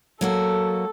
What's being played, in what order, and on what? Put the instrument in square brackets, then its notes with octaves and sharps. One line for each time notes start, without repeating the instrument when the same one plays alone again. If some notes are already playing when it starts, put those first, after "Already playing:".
[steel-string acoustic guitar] F#3 A#3 F#4 [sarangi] A4